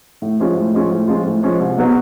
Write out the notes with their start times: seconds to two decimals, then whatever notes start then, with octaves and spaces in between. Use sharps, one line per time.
0.22 A2
0.40 F3 G#3 C#4 F4
0.57 A2
0.74 F3 G#3 C#4 F4
0.91 A2
1.08 F3 G#3 C#4 F4
1.26 A2
1.43 F3 G#3 C#4 F4
1.59 C2
1.77 B2 F#3 B3